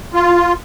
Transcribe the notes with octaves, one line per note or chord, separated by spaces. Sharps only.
F4